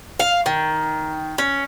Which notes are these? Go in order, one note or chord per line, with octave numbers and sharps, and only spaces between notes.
F5
D#3
C#4